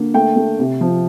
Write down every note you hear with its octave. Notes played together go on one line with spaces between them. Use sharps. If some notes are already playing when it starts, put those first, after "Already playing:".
Already playing: D3 A#3
A3 G5
A3
C3
F3